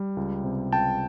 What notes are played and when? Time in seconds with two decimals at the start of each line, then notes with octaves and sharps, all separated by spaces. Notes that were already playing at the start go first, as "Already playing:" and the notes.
Already playing: G3
0.17 C#2
0.44 C3
0.72 C#2 G5 A5